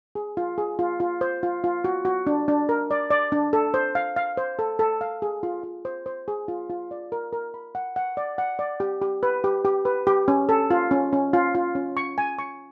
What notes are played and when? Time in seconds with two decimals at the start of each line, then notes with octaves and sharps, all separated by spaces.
0.15 G#4
0.37 F4
0.58 G#4
0.79 F4
1.00 F4
1.21 C5
1.43 F4
1.64 F4
1.84 F#4
2.05 F#4
2.27 D4
2.48 D4
2.69 A#4
2.91 D5
3.10 D5
3.32 D4
3.53 A4
3.74 C5
3.95 F5
4.16 F5
4.37 C5
4.59 A4
4.79 A4
5.01 F5
5.22 G#4
5.43 F4
5.64 F4
5.85 C5
6.06 C5
6.28 G#4
6.48 F4
6.70 F4
6.91 D5
7.12 A#4
7.33 A#4
7.54 B5
7.75 F#5
7.96 F#5
8.17 D5
8.38 F#5
8.59 D5
8.80 G4
9.02 G4
9.23 B4
9.44 G4
9.65 G4
9.85 B4
10.07 G4
10.28 C#4
10.49 A4
10.70 F4
10.91 C#4
11.13 C#4
11.34 F4
11.55 F4
11.75 C#4
11.97 C#6
12.18 G#5
12.39 C#6